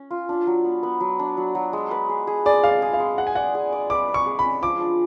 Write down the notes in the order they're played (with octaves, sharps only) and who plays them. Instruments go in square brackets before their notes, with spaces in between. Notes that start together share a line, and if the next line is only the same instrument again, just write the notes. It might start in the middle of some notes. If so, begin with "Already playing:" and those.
Already playing: [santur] C#4
F4
D4
F#3
B3
B3
F#3
D4
F#3
F#3
G#3
B4
G#4
G#4
[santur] G#4 [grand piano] D5
[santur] G#3 [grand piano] F5
[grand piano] D5
[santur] G#4
[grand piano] F5
[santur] G#3
[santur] G#4 [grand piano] F#5
[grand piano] G#5
[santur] D5 [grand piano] F#5
[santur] G#4
D5
[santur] B4 [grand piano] D6
[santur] B4
[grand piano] C#6
[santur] G#4
[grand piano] B5
[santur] C#4
[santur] F3 [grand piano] D6
[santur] D4